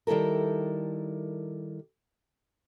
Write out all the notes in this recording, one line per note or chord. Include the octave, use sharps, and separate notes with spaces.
D#3 G3 E4 A4 A#4